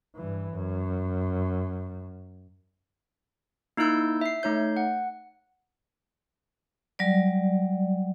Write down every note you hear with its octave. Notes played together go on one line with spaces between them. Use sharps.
G2 E3
F#2
A#3 D#4 E4 E6 G6
E5 C7
A3 D#4 C#5 G6
F#5
F#3 G3 D5